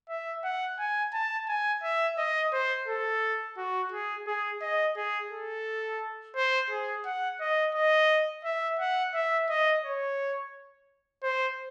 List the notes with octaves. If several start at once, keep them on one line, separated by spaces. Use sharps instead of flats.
E5
F#5
G#5
A5
G#5
E5
D#5
C5
A4
F#4
G#4
G#4
D#5
G#4
A4
C5
G#4
F#5
D#5
D#5
E5
F#5
E5
D#5
C#5
C5